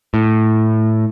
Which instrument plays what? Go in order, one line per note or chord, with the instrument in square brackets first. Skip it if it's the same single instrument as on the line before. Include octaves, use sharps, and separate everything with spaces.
[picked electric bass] A2